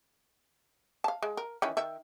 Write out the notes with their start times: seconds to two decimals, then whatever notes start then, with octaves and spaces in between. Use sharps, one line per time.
1.04 F5 A5
1.23 G#3
1.37 A#4
1.62 D#3 E3 C#4
1.77 D#3 E5